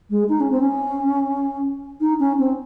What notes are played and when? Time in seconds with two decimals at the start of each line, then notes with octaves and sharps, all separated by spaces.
0.10 G#3
0.28 D#4
0.40 C#4
0.50 C4
0.59 C#4
2.00 D#4
2.19 C#4
2.38 C4